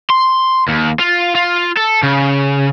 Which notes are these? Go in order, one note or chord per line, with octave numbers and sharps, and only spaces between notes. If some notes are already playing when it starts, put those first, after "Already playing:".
C6
D#2
F4
F4
A4
C#3